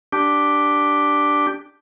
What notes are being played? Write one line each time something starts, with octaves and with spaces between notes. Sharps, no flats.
D4 G4